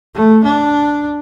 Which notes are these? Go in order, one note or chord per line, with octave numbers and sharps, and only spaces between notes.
A3
D4